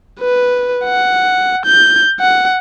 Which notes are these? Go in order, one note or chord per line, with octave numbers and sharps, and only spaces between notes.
B4
F#5
G6
F#5